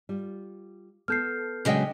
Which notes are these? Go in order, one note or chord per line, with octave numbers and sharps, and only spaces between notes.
G3 F4
B3 A4 F6 G6 C7
C#3 F#3 G#3 D4 D#5 G5